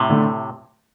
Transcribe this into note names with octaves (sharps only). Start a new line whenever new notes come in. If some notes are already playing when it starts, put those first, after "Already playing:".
Already playing: A2 C3
D3 A3